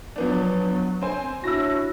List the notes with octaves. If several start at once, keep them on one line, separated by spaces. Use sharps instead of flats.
F3 F#3 B3 D4
C4 C5 G#5
C#4 D4 E4 F#4 E6 A#6